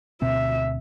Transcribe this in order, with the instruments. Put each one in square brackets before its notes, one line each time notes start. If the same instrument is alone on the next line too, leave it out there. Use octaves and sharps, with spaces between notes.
[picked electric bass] D2 B2 C4 [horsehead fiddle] E5